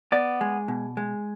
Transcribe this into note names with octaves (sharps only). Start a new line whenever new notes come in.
B3 D5
G#3
B2
G#3